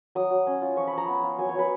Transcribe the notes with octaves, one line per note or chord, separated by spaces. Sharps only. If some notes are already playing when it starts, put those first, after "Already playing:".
F#3 D#6
F#3
C#4
F4
F3 C#6
B5
F3 A#5
B3
F4
F#3 G#5
C#5
F#3 B4